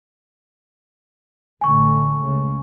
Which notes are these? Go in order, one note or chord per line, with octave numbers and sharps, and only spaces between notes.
A1 D3 A3 G#5 C#6
C#2 C#3